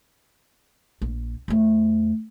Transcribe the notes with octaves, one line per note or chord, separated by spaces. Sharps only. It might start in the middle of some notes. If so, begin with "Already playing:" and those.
A#1
E2 A3